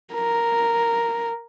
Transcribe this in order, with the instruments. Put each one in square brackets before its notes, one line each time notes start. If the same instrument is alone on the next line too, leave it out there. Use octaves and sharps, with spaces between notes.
[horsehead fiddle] A#4